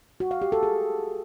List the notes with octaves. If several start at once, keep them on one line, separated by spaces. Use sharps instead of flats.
F#4
F5
G4
A4
G#4